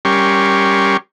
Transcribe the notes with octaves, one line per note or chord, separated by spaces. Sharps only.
G3 C#4 G4 A#4 C6 C#6